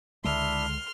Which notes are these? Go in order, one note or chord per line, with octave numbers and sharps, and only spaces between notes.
C#2 D3 G#3 D4 E4 E5 C6 F6